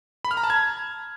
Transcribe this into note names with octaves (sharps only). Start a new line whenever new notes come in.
B5
F6
A#5
A5
G#6